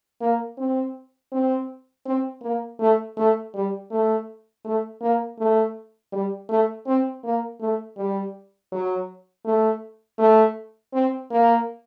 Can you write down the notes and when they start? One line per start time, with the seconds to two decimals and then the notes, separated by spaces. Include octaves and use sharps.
0.21 A#3
0.58 C4
1.32 C4
2.06 C4
2.42 A#3
2.80 A3
3.17 A3
3.55 G3
3.91 A3
4.65 A3
5.01 A#3
5.39 A3
6.12 G3
6.49 A3
6.87 C4
7.24 A#3
7.61 A3
7.97 G3
8.72 F#3
9.45 A3
10.19 A3
10.94 C4
11.31 A#3